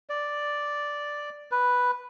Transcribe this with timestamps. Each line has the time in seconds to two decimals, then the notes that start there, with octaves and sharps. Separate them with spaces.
0.10 D5
1.51 B4